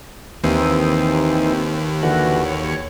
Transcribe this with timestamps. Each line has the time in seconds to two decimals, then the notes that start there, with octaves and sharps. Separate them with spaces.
0.44 D#2 E3 C4 D#4
2.03 D3 E3 F#4
2.45 C#5